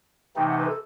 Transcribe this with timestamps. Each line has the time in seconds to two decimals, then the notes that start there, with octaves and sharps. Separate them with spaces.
0.35 C3 E3 A3 D#4 G5
0.47 F#5
0.57 B4
0.68 A4